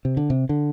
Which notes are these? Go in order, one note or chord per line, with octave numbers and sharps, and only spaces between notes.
C3
D3
C3
D3